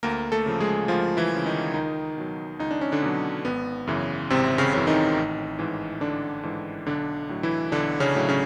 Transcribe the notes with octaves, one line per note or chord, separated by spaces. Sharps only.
D2 A#3 A#4
A3 A4
C#3 F3
G#3 G#4
D2 F3 F4
E3 E4
C#3 F3
D#3 D#4
C#2 D#3 D#4
B2 F#3
C#2 D#4
D4
C#4
D3 D4
B2 F#3
G#1 B3
F#2 C#3 E3
G#1 C3 C4
C#3 C#4
F#2 C#3 E3
D#3 D#4
A1
G#2 E3
A1 D3 D4
G#2 E3
B1 D3 D4
A2 F#3
E3 E4
B1 D3 D4
C#3 C#4
A2 F#3
C#3 C#4